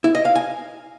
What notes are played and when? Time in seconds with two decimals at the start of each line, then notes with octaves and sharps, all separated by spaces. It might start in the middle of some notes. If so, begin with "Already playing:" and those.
0.04 E4
0.15 D#5
0.25 F5
0.35 G#5